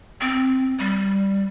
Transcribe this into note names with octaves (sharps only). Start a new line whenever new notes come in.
C4
G3